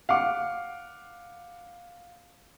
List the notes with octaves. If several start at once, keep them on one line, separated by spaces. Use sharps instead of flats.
F5 F#5 D6